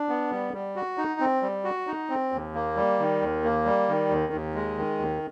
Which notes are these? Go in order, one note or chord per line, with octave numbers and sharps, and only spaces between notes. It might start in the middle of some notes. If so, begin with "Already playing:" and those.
Already playing: D4
B3
G3
G3
F#4
D#4
C4
G3
F#4
D#4
C4
D#2
A#3
G3
D#3
D#2
A#3
G3
D#3
D#2
D#2
G#3
D#3
D#2